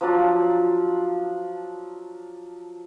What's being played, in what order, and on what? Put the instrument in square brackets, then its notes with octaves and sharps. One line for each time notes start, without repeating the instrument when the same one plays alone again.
[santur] F3 F#3 D4 D5